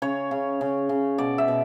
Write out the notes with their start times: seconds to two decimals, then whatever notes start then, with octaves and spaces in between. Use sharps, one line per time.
0.02 C#3 C#5
0.31 C#3
0.61 C#3
0.89 C#3
1.18 B2 D5
1.38 E5
1.48 B2